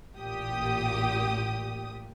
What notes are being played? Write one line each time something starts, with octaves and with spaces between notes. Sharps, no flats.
A1 A#2 G4 D#6